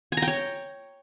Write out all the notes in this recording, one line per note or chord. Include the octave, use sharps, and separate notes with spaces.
G#5
A#5
G5
C#5